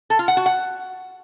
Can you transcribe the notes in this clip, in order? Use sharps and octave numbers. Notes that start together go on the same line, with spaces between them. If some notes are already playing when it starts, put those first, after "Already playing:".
A4
F4
F#5
F#4
F#5